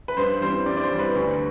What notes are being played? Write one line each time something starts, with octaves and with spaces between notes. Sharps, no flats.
B4
G2 C5
E3 G3 C4 C5
G2 D5
D5
C5
E3 G3 C4
B4
D2